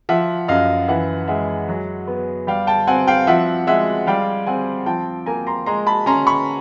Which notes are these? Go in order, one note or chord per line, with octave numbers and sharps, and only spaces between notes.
F3 E5 F#5
F#2 D#5 F5
E3 E5 F#5
G#3 E5 F#5
F#3
B3
G3 F5 G5
G5 A5
C4 F#5 G#5
F5 G5
F3 E5 F#5
G#3 E5 F#5
G3 F5 G5
C4 F#5 G#5
F3 G5 A5
A#3 G#5 A#5
A#5 C6
G#3 A#5 C6
A5 B5
C#4 A#5 C6
B5 C#6